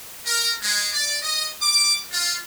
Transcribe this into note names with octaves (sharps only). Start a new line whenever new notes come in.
A#4
G#3
D5
D#5
D6
F4